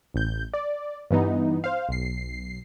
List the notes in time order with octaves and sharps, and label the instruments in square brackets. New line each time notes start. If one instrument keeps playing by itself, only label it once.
[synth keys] A1 G6
D5
G2 E3 B3 D#4
C5 F5
B1 C7